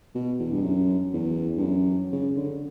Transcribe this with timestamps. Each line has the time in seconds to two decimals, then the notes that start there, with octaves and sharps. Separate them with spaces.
0.15 B2
0.39 E2
0.52 G2
0.63 F#2
1.13 E2
1.57 G2
1.63 F#2
2.12 C#3
2.36 D3